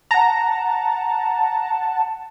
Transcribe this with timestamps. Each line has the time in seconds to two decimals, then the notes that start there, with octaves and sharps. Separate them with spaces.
0.11 F#5 A5 A#5